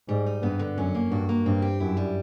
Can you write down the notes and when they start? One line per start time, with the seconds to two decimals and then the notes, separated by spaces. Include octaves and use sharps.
0.09 G#2 G3
0.26 D#4
0.42 G2 B3
0.59 D3
0.77 F#2 C#4
0.95 A#3
1.11 G2 F#4
1.29 A#3
1.46 G2 C4
1.62 G4
1.80 F#2 E4
1.97 G3